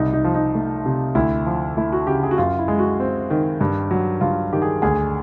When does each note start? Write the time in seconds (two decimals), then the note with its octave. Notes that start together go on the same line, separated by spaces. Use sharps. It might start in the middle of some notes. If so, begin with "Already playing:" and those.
Already playing: C2 D#4
0.13 D#4
0.24 F3
0.34 D#4
0.55 A3
0.86 C3
1.15 D2 E4
1.46 F3
1.77 A3 E4
1.93 F#4
2.07 C#3 G4
2.23 G#4
2.31 F#4
2.38 F#2 F4
2.59 E4
2.68 G#3
2.79 F#4
3.00 C4
3.30 D#3
3.61 G2
3.91 F#3
4.21 G2 F4
4.53 D#3 G4
4.62 G#4
4.82 D2 G#4